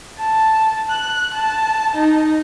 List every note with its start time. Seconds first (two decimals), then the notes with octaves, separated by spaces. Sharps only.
0.19 A5
0.91 F#6
1.34 A5
1.95 D#4